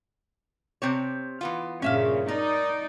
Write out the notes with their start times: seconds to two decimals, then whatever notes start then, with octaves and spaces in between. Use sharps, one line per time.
0.82 C3 C4 C#5
1.41 E3 B3 F4
1.82 G2 A#2 C#3 C#4 E5 F5
2.28 D#4 A#4 D5